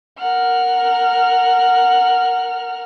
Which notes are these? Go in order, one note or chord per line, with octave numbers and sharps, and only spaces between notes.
A#4 F#5 F6